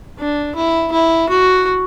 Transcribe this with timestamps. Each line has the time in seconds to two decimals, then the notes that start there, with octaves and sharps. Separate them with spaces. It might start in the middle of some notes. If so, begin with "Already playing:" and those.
0.19 D4
0.55 E4
0.92 E4
1.29 F#4